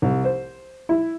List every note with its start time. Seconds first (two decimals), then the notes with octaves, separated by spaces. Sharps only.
0.02 C2
0.24 C5
0.89 E4